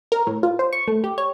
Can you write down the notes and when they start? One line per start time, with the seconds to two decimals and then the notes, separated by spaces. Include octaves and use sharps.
0.12 A#4
0.27 A2
0.43 F4
0.59 C5
0.73 C#6
0.88 A3
1.04 G4
1.18 C#5